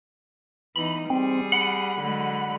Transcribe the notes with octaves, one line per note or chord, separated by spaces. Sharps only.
E3 B3 D#4 B5
G3 C4 G#4
F#5 B5
D3 F#3 G#3